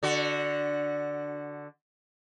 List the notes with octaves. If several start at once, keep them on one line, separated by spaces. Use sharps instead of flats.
D3 F#4